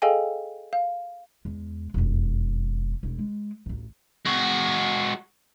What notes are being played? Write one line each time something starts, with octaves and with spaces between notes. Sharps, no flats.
G#4 A4 D#5 F5 G5 G#5
F5
E2 G#3
E1 F2
E1 E4
G#3
A1 D2
G#3 F#4